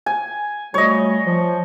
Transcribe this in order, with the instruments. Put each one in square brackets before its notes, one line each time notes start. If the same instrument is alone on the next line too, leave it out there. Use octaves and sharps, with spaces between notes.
[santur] G#5
[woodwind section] F#3 G3 A3 [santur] C#5 D#5
[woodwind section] F3